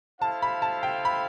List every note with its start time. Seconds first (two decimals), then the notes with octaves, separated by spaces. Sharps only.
0.21 E4 A4 C5 F5 A5
0.42 B5
0.62 A5
0.83 G5
1.05 B5